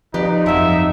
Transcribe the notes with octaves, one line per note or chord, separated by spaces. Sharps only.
F3 D#4 G4 B4 D5
G1 F2 F3 F#3 E5